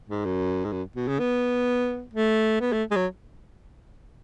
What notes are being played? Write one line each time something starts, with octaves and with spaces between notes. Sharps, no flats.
G#2
F#2
G#2
F#2
B2
C#3
B3
A3
B3
A3
G#3
F#3